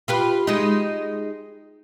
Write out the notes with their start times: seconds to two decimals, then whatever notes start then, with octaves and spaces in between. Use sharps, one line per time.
0.08 F4 G4 B4
0.47 G#3 D#4